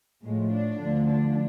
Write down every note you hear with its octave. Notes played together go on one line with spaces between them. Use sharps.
A2 F3 G#3
D4
D2 D3 F3
D4